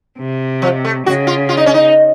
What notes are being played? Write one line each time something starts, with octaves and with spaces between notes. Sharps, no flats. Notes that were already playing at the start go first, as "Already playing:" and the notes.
C3
F3
A3
C#3 F#4
F4
F4
D#4
C#4
D#4